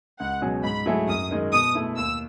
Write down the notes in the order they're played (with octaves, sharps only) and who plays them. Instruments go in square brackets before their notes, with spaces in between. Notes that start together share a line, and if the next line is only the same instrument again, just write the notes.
[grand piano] C#2 [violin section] F#5
[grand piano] B2 F#3 C#4 G#4
[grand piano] G#2 [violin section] B5
[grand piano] F#3 A3 E4 G#4
[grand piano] F#2 [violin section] D#6
[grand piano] D#3 G#3
[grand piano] B2 [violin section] D#6
[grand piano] A3 E4
[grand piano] D#2 [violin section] E6